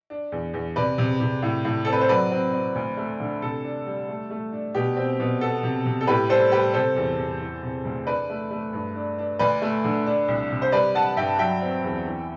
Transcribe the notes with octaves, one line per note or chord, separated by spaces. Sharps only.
D4
E2
E2
C3 B4 D5
C3
C3
A2
A2
C4 A4
B4
C5
F#3 B4 D5
C4
C4
D2
A3
D3
C3 A4
D4
G3
A3
A3
D4
B2 G4
C4
B2
B3 A4
C3
C3
A4
A2 G4 B4
G3 A4 C5
G3 G4 B4
C3 A4 C5
E2
E2
E3
C3
D2
D4 B4 D5
A3
A3
G2
D4
D4
D2 B4 D5
A3
D3
D4
C2
C3
C5
G3 B4 D5
D4 F#5 A5
G2 E5 G5
F#3 E5 G5
C4
E2
E3